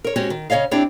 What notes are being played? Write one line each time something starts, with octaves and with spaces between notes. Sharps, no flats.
A#4 C#5
G#3 C4 C#4 F#4 G4
D#3
C#3 C#4 C#5 D#5 F5
C4 D4 E4 G4 C#5